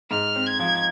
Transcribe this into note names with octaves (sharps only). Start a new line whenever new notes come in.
G#2 F6
C4
G#6
F3